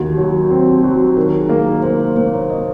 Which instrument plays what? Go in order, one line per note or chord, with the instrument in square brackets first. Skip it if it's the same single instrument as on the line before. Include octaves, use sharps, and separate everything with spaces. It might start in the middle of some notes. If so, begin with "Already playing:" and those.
Already playing: [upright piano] D#2 [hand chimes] F#4
[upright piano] F#3
C4
F#3
[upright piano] D#3 [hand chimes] A#4
[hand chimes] G#4
[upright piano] A#3
[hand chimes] A#4
[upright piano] A#3 [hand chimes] C5
[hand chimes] C5
[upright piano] A#3 [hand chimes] C5
[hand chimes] C#5
D#5